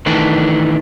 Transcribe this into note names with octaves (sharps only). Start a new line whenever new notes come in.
D#3 E3 A3 D4